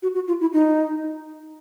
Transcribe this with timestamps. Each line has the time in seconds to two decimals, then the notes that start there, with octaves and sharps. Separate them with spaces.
0.03 F#4
0.15 F#4
0.28 F4
0.41 E4
0.53 D#4